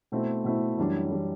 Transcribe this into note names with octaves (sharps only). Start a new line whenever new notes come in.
B2 A3 C4 E4
B2 A3 C4 E4
F#2 E3 G3 D4
E3 G3 D4